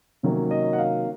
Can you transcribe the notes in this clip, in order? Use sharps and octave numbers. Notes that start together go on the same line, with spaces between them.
C3 D#3 F#3 A#3 C#4 C#5
D#5
F#5
F5